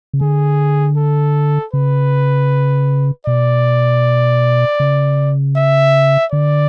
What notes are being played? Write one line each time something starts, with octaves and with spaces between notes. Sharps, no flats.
C#3
D3 G#4
A4
C#3 B4
B2 D5
C#3
E5
D3 D5